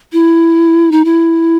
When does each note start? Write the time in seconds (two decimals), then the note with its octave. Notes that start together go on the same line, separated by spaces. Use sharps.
0.13 E4
0.92 D#4
1.05 E4